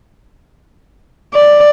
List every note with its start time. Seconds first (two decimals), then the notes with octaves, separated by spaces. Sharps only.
1.34 D5